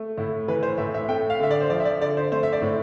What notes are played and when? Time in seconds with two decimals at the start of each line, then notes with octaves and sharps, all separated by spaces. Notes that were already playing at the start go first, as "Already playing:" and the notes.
Already playing: A3
0.17 A2 E4
0.48 E3 B4
0.63 C5
0.78 A2 E5
0.94 E5
1.09 A3 G5
1.30 F5
1.39 D3 E5
1.51 D5
1.61 C5
1.70 F3 D5
1.80 E5
1.85 D5
2.00 D3 D5
2.17 C5
2.32 A3 C5
2.43 E5
2.53 D5
2.62 A2